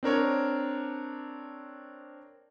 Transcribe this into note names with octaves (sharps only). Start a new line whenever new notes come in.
C4 D4 A#4 C#5